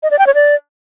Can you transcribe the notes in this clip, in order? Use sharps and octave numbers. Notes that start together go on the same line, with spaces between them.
D#5
D5
G5
C#5
D5